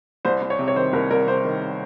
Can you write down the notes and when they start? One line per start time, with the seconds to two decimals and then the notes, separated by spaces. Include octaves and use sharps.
0.25 C2 C5
0.42 C2
0.50 C#5
0.59 C3
0.68 C#5
0.76 D#3 C5
0.93 C2 A#4
1.10 C2 A#4
1.27 C3 C5
1.45 D#3